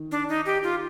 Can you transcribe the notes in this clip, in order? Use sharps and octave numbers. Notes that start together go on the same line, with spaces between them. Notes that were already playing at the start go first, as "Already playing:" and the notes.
Already playing: D#3
D4
D#4
G4
F4